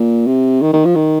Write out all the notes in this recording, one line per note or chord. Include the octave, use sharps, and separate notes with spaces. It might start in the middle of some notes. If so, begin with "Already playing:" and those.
Already playing: A#2
C3
D#3
D#3
F3
D#3